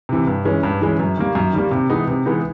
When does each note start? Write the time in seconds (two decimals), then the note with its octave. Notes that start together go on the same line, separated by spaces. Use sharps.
0.09 C3 E3
0.27 G2
0.45 E3 G#3 C#4
0.63 G2
0.81 E3 G#3 C#4
0.99 F#2
1.18 D#3 G3 A#3
1.35 F#2
1.53 D#3 G3 A#3
1.71 C3
1.90 E3 G#3 B3 D#4
2.07 C3
2.25 E3 G#3 B3 D#4